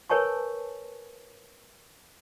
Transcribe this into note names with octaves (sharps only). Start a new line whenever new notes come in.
A#4 B4 C#5 G#5 A5 C#6